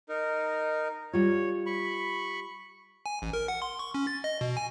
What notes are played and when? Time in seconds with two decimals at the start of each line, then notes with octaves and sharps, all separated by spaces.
0.09 D#4 A#4
1.13 G3 F4 C#5
1.66 B5 C#6
3.06 G#5
3.22 A1
3.33 A#4
3.48 F#5
3.62 C6
3.79 C#6
3.95 C#4
4.07 A6
4.24 D#5
4.41 B2
4.57 G#5